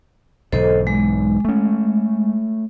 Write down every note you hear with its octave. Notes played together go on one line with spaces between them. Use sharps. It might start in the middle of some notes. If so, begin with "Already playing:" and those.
B1 G#2 E3 A4 C5 D#5
G#3
A3 C#4